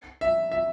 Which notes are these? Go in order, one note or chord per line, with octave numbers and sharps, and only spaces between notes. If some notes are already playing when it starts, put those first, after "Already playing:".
E5
E5